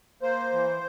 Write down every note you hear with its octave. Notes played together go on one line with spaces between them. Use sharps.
A#3 C5
E3